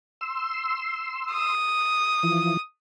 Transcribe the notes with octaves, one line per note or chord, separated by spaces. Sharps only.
C6 E6
D#6
E3 F3